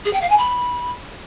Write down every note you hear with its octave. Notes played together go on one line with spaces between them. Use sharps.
G#4
G5
F5
G#5
B5